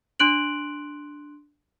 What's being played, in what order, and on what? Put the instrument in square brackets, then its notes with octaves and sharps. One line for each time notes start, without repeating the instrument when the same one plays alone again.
[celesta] D4 C6 F#6 D7 F#7